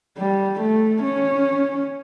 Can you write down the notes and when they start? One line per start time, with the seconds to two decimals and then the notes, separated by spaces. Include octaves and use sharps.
0.18 G3
0.61 A3
1.03 C#4